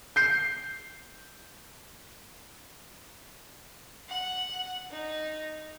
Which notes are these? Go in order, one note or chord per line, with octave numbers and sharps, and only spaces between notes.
G6 C7
F#5
D#4